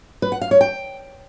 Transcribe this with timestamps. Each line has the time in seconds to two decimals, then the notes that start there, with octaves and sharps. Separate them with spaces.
0.22 B4
0.32 F#5
0.42 F5
0.51 C#5
0.61 G5